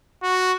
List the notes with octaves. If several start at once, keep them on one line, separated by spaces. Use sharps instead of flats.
F#4